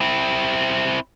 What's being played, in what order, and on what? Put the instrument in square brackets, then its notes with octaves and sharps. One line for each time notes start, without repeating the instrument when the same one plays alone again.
[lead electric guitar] C4 E4